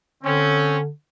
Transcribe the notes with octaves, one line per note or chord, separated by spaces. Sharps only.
D3 C4 C#4